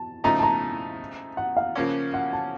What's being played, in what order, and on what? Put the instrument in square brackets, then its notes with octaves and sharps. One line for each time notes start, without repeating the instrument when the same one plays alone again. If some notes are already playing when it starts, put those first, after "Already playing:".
Already playing: [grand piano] A5
[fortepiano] C#3 F3 A3 D#4 [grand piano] A#5
[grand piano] A5
A#5
F#5
F5
[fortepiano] C#3 F3 A#3 C#4
[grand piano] F#5
A5